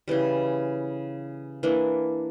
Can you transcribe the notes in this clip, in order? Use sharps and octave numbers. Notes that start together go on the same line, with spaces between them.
C#3 E3 G3
E3 A#3 D4